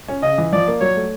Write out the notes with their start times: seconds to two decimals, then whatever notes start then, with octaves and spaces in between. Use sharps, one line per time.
0.08 C#4
0.22 C#3 D#5
0.38 E3
0.52 F3 D5
0.67 A#3
0.81 F#3 C#5
0.96 A3